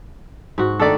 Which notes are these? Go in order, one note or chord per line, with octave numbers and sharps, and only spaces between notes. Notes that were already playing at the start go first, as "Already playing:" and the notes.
G#2 F#4
D#3 A3 D4 A4 D5